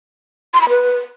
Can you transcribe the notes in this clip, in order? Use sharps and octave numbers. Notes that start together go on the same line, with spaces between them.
C6
B5
B4